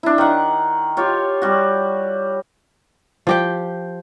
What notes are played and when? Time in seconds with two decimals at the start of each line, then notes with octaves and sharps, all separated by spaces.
0.03 D4 E4
0.18 D#3 F#5
0.97 F4 G4 C#5
1.42 G3 F#4
3.27 F3 G4 G5